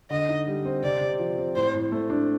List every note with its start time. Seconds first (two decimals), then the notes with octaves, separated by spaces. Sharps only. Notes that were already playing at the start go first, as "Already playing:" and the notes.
0.10 D3 D#5
0.29 D#4
0.47 G3
0.65 C4
0.83 C3 D5
1.01 C3
1.19 F3
1.38 C4
1.55 A2 C5
1.74 A2
1.92 A3
2.10 D4